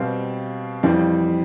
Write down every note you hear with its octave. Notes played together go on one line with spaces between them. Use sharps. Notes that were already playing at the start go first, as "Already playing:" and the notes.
Already playing: B2 G3 C4 F5
F2 E3 G3 C4